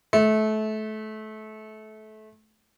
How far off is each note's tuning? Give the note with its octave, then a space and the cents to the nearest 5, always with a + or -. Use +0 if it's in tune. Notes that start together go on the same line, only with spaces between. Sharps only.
A3 -25